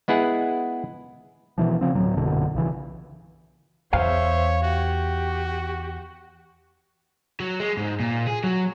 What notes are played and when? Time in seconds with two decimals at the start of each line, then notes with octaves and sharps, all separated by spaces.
0.08 G#3 B3 E4 G#4 F#5
1.58 B2 E3 F3
1.81 C#3 F3 C4
1.95 D2 A2 F#3
2.16 A#1 F#2 B2 D3
2.54 B1 C#3 E3
3.93 E2 C5 C#5 E5 F5
4.63 F#4 G4
7.40 F#3
7.60 G#3
7.77 G#2
8.00 A#2
8.27 G#4
8.44 F#3